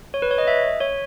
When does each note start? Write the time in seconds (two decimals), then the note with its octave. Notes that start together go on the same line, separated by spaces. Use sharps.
0.14 C#5
0.22 B4
0.31 C#5
0.38 D#5
0.47 E5
0.80 C#5